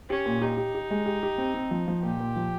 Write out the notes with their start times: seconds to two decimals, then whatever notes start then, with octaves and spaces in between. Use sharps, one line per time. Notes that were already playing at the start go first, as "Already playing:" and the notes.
0.10 C#4 G4
0.26 A#2
0.42 D#4 G4
0.57 G4
0.75 G4
0.91 G#3
1.06 G4
1.23 G4
1.38 C4
1.54 C4
1.71 F3
1.88 F3
2.03 A#2 G4
2.20 A#2
2.36 F3